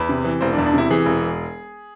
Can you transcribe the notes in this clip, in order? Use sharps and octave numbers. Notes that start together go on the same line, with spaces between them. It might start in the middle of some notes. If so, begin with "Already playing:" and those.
Already playing: E2 B4
C3
E3
E1 C5
D4
E2
D4
C3 E4
E3 G#4
E1